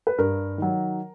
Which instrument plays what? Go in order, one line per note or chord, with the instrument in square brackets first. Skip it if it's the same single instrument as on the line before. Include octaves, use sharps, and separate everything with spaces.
[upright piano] B4
G2 A#4
D#3 F#3